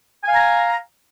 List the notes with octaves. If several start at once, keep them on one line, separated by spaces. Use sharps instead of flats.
F5 G#5 A#5